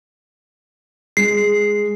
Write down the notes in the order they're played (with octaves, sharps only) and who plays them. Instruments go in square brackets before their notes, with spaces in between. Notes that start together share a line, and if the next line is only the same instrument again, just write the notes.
[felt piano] G#3 [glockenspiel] C7